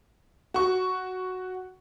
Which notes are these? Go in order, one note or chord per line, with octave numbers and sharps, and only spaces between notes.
F#4 C#6